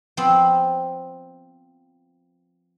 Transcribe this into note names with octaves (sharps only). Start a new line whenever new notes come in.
F3 B3 C4